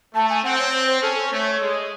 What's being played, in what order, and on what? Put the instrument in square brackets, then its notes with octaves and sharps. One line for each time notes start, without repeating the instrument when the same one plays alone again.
[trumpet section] A3 [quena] A5
[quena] G#5
[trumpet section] C4 [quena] F#5
[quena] C#5
C5
C5
[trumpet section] C#4 [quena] A4
[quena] C5
[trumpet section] A3 [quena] C#5
[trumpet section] G#3